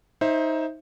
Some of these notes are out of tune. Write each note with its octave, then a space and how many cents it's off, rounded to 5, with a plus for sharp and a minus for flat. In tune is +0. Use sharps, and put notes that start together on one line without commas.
D#4 +15 C5 +20 E5 +0